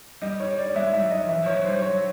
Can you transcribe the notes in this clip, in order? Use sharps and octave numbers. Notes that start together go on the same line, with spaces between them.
G3 D#5
C#5
D5
G#3 E5
G3 E5
F#3
D#5
F3
E3 E5
F3 C#5
F#3
G3 C5
F#3 C#5